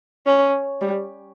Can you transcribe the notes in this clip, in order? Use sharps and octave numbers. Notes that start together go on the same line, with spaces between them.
C#4
G3